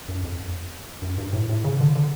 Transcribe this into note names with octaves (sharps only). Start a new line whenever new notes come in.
F#2
F2
F#2
G2
A2
A2
C#3
D3
D3